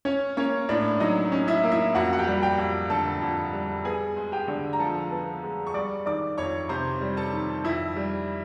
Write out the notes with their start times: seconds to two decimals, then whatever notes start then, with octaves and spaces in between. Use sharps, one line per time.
0.05 C#4 C#5
0.37 A#3 C#4 C#5
0.69 A2 D4 D5
1.00 F#3 D#4 D#5
1.32 C#4
1.48 E4 E5
1.64 A#3
1.72 E4 E5
1.95 F2 F#4 F#5
2.13 F#5
2.19 G4 G5
2.27 G3
2.42 G4 G5
2.58 F2
2.90 D3 A4 A5
3.22 F2
3.53 G3
3.85 B3 G#4 G#5
4.17 G#3
4.32 G4 G5
4.48 D3
4.73 A#5
4.79 F3 A4 A5
5.11 B3
5.43 G#3
5.67 C#6
5.74 G3 D5 D6
6.06 D#3 D5 D6
6.38 F2 C#5 C#6
6.69 C3 C5 C6
7.01 G3
7.17 A4 A5
7.33 D#3
7.64 F2 E4 E5
7.96 G3